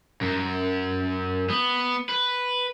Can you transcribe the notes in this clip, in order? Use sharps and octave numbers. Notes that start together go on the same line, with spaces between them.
F#2
B3
B4